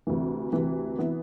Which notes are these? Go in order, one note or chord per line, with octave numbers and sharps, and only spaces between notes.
D2 C3 E3
D2 C3 E3
E3 B3 E4